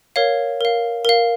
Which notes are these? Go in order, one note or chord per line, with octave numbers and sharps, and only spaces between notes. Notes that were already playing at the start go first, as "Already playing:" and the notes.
A#4 C#5 F5
A#4 F5
A#4 F5